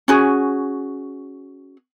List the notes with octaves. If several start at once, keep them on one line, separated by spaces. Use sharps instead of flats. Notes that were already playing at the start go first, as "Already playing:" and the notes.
C#4 F#4 G#4